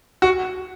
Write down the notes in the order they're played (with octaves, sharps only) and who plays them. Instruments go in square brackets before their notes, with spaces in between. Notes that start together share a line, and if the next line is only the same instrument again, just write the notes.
[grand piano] F#4